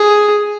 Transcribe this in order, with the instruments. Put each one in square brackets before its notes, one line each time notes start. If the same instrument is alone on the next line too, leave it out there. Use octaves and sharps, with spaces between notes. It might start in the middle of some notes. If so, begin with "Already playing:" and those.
Already playing: [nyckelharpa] G#4